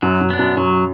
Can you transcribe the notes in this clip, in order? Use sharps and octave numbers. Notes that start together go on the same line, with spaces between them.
F#2 F#3
F#2
B3 D4
F#2
F#2 F#3